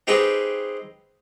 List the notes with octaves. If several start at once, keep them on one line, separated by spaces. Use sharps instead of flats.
C4 D#4 G4 G#4 B4